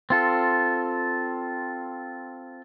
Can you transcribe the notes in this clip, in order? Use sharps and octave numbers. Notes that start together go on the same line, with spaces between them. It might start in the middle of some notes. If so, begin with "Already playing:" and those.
C4 F4 A4